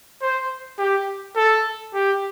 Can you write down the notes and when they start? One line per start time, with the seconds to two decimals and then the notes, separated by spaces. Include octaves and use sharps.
0.22 C5
0.79 G4
1.36 A4
1.94 G4